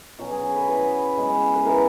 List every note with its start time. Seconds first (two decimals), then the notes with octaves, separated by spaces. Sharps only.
0.19 B2 F#3 C#4 F#4
0.31 G#4
0.43 G#4
0.56 B4
0.67 E3 B3 B4
1.17 C#3 G#3 B3
1.55 B4
1.65 E3 B3 A#4